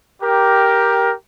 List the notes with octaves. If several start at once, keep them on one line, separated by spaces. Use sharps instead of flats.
G4 A#4